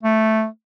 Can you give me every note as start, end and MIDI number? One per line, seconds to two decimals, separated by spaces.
0.03 0.46 57